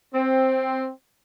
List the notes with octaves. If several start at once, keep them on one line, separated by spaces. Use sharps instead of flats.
C4